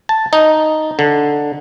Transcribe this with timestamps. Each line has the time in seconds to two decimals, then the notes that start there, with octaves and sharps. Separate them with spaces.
0.09 A5
0.33 D#4
0.99 D3